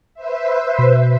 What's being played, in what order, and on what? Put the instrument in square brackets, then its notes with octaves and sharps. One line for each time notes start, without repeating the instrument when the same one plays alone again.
[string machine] B4 C5 E5
[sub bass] B2